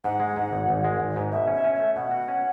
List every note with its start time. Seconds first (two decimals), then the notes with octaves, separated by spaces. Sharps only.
0.04 G#2 F#5
0.20 G#3
0.36 G#2
0.51 G#1
0.69 G#1
0.84 G#3
1.00 G#1
1.16 G#2
1.32 B2 E5
1.47 C#4
1.54 E5
1.64 C#4
1.75 E5
1.80 A3
1.96 B2 F#5
2.11 F#4
2.28 C#4